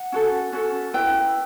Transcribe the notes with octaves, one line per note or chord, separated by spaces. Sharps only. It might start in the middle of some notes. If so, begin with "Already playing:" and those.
Already playing: F#5
C#4 F#4 A4
C#4 F#4 A4
E4 B4 G5